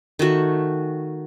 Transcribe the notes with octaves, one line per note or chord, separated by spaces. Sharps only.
D#3 A3 F#4